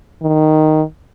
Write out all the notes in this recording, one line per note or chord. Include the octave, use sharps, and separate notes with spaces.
D#3